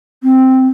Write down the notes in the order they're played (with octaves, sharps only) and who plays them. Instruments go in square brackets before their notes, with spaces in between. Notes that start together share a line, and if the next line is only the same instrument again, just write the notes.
[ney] C4